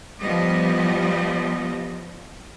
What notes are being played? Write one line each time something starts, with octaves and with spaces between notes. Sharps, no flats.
F3 G3 B3 D#5